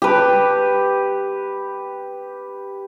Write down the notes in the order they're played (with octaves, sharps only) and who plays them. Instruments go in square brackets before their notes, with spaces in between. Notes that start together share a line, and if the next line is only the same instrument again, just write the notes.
[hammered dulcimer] G4 B4